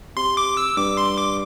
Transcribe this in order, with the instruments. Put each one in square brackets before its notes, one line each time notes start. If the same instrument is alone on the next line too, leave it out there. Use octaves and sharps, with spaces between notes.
[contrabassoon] C3 [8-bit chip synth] C6
[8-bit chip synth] D6
E6
[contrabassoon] G2 [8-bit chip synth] D6
[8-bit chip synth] C6
D6